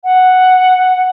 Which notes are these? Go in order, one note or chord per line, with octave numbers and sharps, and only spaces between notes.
F#5